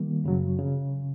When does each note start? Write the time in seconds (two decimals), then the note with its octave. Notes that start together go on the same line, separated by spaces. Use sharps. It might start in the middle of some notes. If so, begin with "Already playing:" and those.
Already playing: D#3 G3 A#3
0.24 F#2 C#3 F#3
0.59 C#3